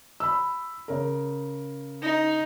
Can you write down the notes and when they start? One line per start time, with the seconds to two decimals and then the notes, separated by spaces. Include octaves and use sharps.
0.20 B5 E6
0.88 C#3 A#4
2.03 D#4